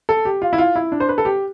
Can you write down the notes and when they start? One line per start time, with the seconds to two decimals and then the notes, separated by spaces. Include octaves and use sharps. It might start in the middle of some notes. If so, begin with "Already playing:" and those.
0.09 A4
0.25 G4
0.42 F4
0.53 E4
0.58 F4
0.76 E4
0.92 D4
1.00 C5
1.09 B4
1.18 A4
1.25 G4